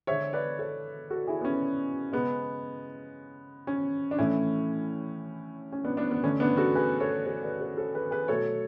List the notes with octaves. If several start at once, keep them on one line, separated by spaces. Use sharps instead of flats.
D3 G#3 C#5 E5
B4 D5
A4 C#5
F#4 A4
E4 G#4
B3
C#4
C#3 G#3 B3
C#4
D4
A2 E3 A3 C#4 E4
C#4
B3 D4
B3 D4
B3
D3 A3 C#4
B3 D4
F#4 A4
G#4 B4
A4 C#5
A4 C#5
B4 D5
A4 C#5
A4 C#5
G#4 B4
G#4 B4
B2 F#3 A3 A4 C#5